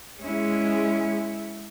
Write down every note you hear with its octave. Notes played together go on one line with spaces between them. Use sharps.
G#3 C#4 E4